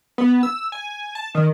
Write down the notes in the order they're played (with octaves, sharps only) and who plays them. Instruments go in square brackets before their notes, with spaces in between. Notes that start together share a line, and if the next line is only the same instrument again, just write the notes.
[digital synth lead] B3
E6
G#5
A5
D#3